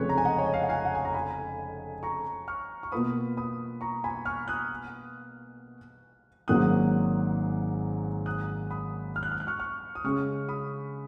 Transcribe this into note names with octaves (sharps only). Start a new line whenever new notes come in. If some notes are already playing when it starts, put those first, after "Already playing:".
Already playing: F1 F2 C#3 G#3 B4 C#5
A#5
G#5
D#5 F#5
C#5
D#5
F5
F#5
F5 G#5
F#5
G#5
A#5
G#5 B5
A#5 C#6
C#6 F6
C#6
B2 A#3 F4 B4 B5 D#6
B5 D#6
A#5 C#6
G#5 B5
C#6 F6
D#6 F#6
G#1 G#2 F#3 A#3 C#4 D#6 F#6
D#6 F#6
B5 D#6
F6
F#6
F6
F#6
C#6 F6
C#6 F6
D#6
C#3 G#3 C#4 G#4 C#6 F6
B5 D#6